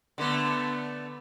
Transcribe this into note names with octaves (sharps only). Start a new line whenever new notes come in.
D3 A3 B3